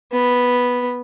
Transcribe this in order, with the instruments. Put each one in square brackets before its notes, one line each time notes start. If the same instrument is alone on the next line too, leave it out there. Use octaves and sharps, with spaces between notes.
[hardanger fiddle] B3